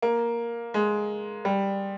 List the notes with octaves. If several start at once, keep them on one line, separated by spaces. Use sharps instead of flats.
A#3
G#3
G3